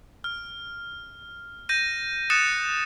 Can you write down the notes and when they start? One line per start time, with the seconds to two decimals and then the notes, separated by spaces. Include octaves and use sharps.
0.24 F6
1.69 G6 A#6 D#7
2.30 D#6 F#6 A6 C#7 E7